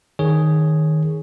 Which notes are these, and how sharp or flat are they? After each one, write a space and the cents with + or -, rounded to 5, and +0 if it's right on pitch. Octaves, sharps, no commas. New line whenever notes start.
D#3 +0 G#4 +0 C#5 +0